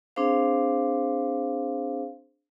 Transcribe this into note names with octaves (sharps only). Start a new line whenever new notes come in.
C4 D4 G#4 C5 F5